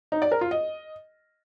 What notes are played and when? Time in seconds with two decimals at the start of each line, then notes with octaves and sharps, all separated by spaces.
0.12 D#4
0.22 D5
0.32 A#4
0.41 F4
0.51 D#5